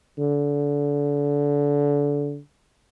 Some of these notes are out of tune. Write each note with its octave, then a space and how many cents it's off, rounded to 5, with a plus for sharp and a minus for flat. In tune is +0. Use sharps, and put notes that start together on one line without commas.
D3 -25